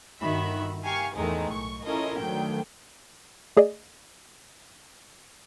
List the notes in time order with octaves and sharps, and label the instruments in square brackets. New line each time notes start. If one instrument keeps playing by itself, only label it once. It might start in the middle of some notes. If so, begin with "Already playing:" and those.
[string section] G1 D#3 F#4 E5 B5
G4 A#4 F5 G#5 C#6
E2 A2 D#3 G#3 A3 D#4
B1 C#6
C#4 E4 F4 A4 A#4 D#5
D2 D#3 F#3 G5
[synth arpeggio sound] A3 G#4 D5 D#5